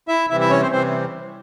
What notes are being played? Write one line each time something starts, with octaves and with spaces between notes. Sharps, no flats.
E4 E5
C3 E3 G3 E4 E5
E4 E5
C#4 C#5
C4 C5
C3 E3 G3 C4 C5